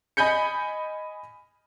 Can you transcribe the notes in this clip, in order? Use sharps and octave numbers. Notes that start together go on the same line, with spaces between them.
D#5 G#5 B5 G6 C#7